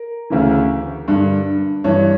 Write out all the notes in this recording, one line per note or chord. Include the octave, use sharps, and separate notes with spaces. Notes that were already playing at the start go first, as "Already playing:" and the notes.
Already playing: A#4
D2 C#3 E3
G2 D3
G2 E3 C#5